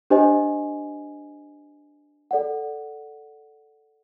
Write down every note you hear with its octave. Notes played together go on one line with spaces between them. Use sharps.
D4 G4 C5 D#5 G#5
A4 D5 F#5